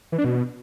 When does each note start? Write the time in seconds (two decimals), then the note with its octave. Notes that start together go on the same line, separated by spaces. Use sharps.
0.12 E3
0.18 D4
0.25 B2